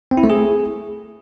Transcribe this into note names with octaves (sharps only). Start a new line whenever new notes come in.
C4
E4
A3
G#4